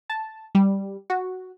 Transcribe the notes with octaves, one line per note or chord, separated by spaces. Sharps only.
A5
G3
F#4